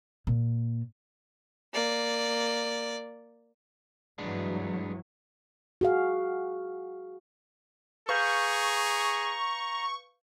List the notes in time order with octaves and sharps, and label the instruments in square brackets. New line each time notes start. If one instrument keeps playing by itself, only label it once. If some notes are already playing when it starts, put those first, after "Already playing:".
[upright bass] A#2
[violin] A#3 D5
[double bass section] G2 E3 F#3 [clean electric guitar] G#3 B3 D4
[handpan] F#4 G#4 F5
[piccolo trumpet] G#4 [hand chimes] B4 F5 G6 [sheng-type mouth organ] A#5 [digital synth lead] C#6